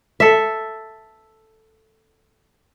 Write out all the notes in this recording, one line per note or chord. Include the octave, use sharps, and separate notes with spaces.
A4 E5